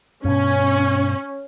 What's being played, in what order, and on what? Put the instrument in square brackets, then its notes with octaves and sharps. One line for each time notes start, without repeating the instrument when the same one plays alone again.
[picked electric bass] G2 B2 [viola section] C#4